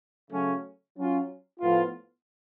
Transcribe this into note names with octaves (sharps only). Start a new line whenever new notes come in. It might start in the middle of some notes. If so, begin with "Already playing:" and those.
C#3 F#3 A3 C#4
F#3 C#4 F4
A2 F3 B3 F4